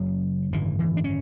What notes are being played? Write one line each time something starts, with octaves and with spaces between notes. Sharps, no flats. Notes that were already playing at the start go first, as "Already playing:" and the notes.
Already playing: F#1 F#2 C#3 F#3
G#1 F#2 D3 E3
E3
D4
C#4